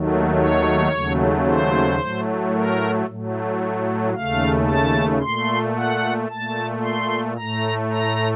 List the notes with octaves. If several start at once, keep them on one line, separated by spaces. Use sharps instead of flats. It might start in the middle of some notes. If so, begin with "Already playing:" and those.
Already playing: D#2 D#3 F#3 A3
C#5
D#2 C#3 F#3 A3
C5
A2 F#3 A3
A#4
A2 F#3 A3
D#2 C#3 A3 F5
A5
A#2 A3 C6
F#5
A#2 A3 A5
C6
A2 A3 A#5
A#5